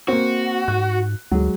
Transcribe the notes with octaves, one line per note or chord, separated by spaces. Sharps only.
A#3 C4 F#4
G#2 F#6
D2 F#3 G#3